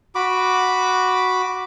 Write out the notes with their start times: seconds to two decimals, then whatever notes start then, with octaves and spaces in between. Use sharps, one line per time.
0.15 F#4 B5 D6